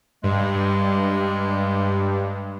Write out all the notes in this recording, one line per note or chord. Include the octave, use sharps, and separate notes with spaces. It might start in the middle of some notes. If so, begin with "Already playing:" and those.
G2 G#3